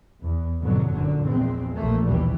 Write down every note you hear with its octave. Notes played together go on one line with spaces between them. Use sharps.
E2
F2 G#2 B2 D3 F#3
F#1 F#2 A#2 D3
A#1 E2 A#2 G#3 C4
A#1 F3 A3 A#3
D#2 B2 E3 G3